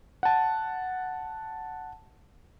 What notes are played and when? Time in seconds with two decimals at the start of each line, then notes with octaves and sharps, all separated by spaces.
0.23 F#5 A5